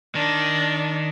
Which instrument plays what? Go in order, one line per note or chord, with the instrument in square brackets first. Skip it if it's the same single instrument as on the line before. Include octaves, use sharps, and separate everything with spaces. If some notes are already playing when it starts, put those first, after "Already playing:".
[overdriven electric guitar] D#3 [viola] D4